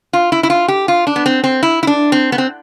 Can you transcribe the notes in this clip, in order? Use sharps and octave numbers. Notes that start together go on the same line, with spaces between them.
F4
E4
E4
F4
G4
F4
D4
B3
C4
C4
E4
E4
D4
C4
B3
C4